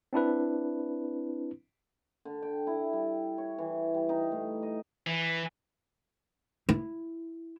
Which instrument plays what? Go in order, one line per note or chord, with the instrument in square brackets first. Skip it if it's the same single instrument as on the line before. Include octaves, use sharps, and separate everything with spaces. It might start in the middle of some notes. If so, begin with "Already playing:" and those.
[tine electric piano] C4 D4 E4 B4
[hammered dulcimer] D3
G5
E4
G3
C#5
E3
G3
D#4
A2
D#5
[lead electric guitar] E3
[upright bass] E4